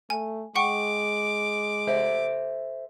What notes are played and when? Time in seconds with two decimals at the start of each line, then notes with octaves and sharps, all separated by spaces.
0.10 A3 G#5
0.56 G#3 F#5 G5 C#6 D6
1.87 A4 C5 E5